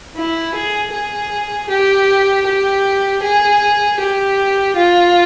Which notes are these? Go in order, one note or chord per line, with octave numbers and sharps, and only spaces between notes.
E4
G#4
G#4
G4
G4
G#4
G4
F4